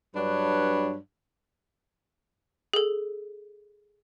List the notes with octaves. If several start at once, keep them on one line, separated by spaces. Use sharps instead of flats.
G2 F#3 D4 B4 C#5
G#4 A4